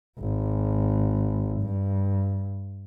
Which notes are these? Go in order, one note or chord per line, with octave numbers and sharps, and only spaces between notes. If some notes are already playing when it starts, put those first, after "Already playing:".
G#1
G2